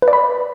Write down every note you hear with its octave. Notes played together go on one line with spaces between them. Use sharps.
B4
D5
B5